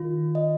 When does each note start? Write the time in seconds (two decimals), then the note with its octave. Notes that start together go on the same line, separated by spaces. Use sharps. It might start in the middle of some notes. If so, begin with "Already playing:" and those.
Already playing: D#3 F4
0.35 D#5